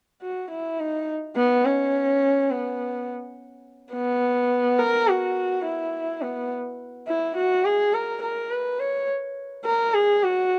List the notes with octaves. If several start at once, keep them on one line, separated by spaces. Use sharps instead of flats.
F#4
E4
D#4
B3
C#4
B3
B3
A#4
F#4
E4
B3
E4
F#4
G#4
A#4
A#4
B4
C#5
A#4
G#4
F#4